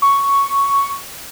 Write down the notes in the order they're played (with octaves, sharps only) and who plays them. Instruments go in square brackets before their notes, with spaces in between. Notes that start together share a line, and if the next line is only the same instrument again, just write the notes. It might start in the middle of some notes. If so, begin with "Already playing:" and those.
[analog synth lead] C#6